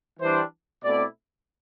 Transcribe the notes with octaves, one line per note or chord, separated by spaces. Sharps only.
E3 G3 D4 C5
B2 A3 C4 E4 D5